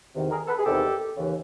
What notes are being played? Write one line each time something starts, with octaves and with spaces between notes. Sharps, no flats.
E2 C3 D#3
G#4 A#4
A4 B4
G#4
E2 C3 D#3 G4 A4
D#2 C#3 E3